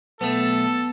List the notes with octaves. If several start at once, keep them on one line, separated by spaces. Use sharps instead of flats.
B1 A3 B3 A4 A5